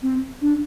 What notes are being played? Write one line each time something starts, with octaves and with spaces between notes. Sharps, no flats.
C4
D4